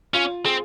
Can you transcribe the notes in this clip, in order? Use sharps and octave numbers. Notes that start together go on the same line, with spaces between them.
C#4 F4
C4 G#4